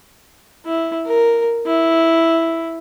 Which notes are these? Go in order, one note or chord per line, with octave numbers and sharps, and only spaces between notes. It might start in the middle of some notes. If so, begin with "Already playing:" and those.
E4
A#4
E4